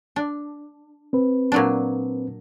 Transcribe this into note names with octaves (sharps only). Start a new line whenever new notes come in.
D4
C4 B4
A#2 F#3 D4